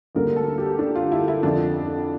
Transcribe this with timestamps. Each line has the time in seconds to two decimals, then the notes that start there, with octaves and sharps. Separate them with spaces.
0.15 D2 D3 G3 A#3 A#4
0.36 A4
0.58 G4
0.79 D4
0.95 F4
1.12 E4
1.28 E4
1.43 F2 D3 F3 D4